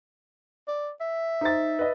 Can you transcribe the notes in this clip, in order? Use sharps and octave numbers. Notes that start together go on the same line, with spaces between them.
D5
E5
D#4 C5 A6
B4 D#5